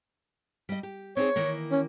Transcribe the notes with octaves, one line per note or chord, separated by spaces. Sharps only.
G3 D#5
G4
C4 D#4 G#4 C#5
D#3 E3 A#3
C#4